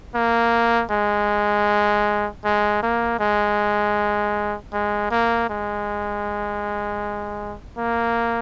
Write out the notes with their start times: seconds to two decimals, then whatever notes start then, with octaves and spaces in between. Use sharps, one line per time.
0.15 A#3
0.91 G#3
2.44 G#3
2.83 A#3
3.20 G#3
4.73 G#3
5.11 A#3
5.49 G#3
7.77 A#3